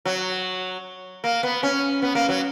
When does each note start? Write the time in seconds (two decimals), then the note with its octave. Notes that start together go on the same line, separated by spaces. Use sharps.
0.05 F#3
1.24 A#3
1.43 B3
1.63 C#4
2.02 B3
2.15 A#3
2.29 F#3